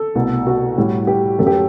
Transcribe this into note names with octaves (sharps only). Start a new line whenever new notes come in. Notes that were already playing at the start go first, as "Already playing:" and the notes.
Already playing: A4
C2 B2 A3
F#4
A2 G3
G4
F#2 F#3 A3 A4
G4
A4